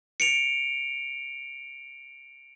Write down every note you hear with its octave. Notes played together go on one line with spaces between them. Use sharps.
C#7 D7 F7